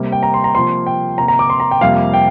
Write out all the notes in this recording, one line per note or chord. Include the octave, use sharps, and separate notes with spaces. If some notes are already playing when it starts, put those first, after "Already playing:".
Already playing: C3 G3 A#3
G5
A#5
C6
A#5
C3 F3 A#3 C6
G5
C3 A#3 A#5
A#5
D6
C6
A#5
G5
F2 C3 G3 A#3 F5
G5